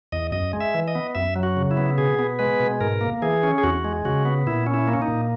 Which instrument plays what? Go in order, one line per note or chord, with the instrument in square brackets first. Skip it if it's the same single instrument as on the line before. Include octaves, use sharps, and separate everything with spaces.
[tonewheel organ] E2 D#5
F#2 D#5
G#3
E5
E3
D#5
B3
F#2 E5
F#3
F#4
C#3
E4
B3
B2 G#4
B3
G#3 B4
B2
G#2 A#4
A#3
E3 G#4
C#4
G#4
E2 F#4
G#3
C#3 F#4
B3
A#2 E4
C#4
E4
A#3
C#4
D#4
A#2